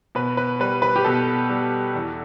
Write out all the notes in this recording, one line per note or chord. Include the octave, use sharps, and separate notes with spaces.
B2 B4
B4
G3 B4
B4
G4
B2 A4
G3
E2